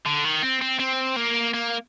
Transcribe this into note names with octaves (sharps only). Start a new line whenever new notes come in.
D3
D#3
C4
C4
C4
A#3
A#3